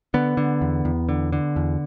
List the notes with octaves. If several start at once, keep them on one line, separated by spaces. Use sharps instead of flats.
D3 B3
D3
E2
E2
D3
D3
E2